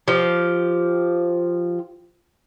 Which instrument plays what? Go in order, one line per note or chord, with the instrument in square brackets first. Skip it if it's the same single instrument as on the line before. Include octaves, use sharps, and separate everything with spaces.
[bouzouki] F3 G4